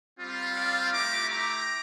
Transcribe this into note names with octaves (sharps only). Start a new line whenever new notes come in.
G3 C4 F4
D5 F5
A3 E4 G4 A#5 D6
A#5 D6